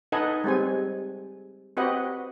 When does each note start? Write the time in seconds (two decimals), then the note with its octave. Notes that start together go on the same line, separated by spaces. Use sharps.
0.12 D#4 A4 B4 D#5 F#5 G#5
0.44 G3 G#3 C4 G#5
1.77 C4 F#4 G4 B4 D#5 F#5